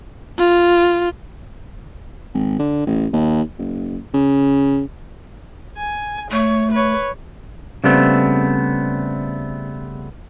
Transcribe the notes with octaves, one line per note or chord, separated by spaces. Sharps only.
F4
G#1
D3
A1
D#2
F#1
C#3
G#5
A3 C#5
B4 C#5
C#3 G3 A3 B3 C4